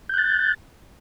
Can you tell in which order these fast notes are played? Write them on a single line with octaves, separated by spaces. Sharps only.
G6 F#6 A6